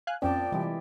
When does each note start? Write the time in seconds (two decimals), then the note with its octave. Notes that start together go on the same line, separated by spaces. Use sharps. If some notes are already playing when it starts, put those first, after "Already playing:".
0.07 F5 G#5 F#6
0.22 F2 A#2 F3 C4 C#4 D5 G5 A5
0.52 C3 E3 G3 G#3 E4 G4